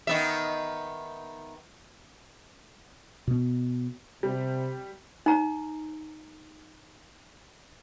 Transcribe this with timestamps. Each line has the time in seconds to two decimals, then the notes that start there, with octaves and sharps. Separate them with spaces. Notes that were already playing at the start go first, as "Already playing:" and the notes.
0.07 D#3 B3 E5
3.27 B2 B3
4.23 C3 G3
5.26 D#4 A#5